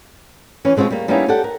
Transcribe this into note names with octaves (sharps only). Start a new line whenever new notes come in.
E3 C#4
B2 G#3 C4 F4 C#5
G3 A#3
G3 A#3 B3 C#4 D#4 E4
G4 A4 D5 F#5
A#4